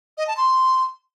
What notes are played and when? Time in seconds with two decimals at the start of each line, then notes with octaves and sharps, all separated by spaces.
0.18 D#5
0.27 A5
0.37 C6